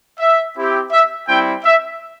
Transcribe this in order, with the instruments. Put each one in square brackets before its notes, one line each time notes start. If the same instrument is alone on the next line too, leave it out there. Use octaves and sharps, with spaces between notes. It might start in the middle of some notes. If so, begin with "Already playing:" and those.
[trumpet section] E5
C4 E4 G4
E5
G3 C4 E4 G5
E5